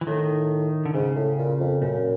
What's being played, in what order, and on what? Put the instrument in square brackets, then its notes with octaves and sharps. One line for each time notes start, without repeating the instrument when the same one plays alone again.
[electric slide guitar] E3
[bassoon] A2 [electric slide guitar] D#3
[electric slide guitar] D3
[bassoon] G#2 [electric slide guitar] C#3
[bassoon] A2
A#2
F2
[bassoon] F#2 [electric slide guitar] A#2